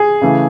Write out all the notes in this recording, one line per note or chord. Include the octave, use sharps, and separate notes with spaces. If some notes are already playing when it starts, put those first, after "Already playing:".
Already playing: G#4
C#3 E3 A3